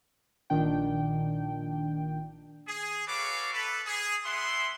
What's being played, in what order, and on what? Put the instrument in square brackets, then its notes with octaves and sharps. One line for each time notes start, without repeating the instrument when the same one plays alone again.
[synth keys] A#1 A#2 D#3 D4 G5
[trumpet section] G#4
F#4 A4 B4 C#5 F5 D6
A4 B4
G#4
B3 E4 E5 F#5 C6